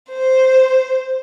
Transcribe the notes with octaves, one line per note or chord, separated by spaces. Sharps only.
C5